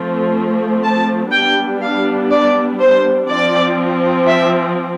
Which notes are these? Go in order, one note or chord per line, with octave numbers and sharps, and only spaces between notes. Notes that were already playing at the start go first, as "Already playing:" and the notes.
Already playing: F3 A3 C4
A5
G3 B3 D4 G5
F5
D5
C5
F3 C4 D5
E5